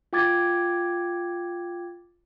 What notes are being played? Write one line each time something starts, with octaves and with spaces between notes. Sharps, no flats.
F4 G5 D6 G#6 A6